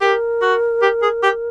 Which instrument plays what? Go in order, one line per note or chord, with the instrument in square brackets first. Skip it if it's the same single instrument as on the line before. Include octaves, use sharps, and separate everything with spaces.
[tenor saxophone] G4 [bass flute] A#4
[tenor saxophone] F#4
G4
G#4
G4